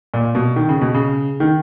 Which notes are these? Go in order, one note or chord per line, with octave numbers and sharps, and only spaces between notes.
A#2
B2
D#3
C#3
B2
C#3
D#3